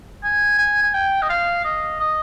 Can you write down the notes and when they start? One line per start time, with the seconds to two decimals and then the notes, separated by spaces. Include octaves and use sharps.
0.23 G#5
0.58 G#5
0.82 G#5
0.94 G5
1.22 D#5
1.29 F5
1.65 D#5
2.00 D#5